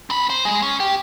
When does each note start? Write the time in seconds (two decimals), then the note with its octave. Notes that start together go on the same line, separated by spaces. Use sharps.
0.10 C4 B5
0.30 C5
0.45 G#3
0.62 C#4
0.80 G4